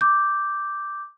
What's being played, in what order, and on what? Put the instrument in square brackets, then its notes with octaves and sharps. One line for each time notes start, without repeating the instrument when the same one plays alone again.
[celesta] D6 G6